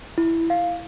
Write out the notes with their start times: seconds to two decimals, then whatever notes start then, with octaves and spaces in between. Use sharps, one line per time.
0.18 E4
0.50 F5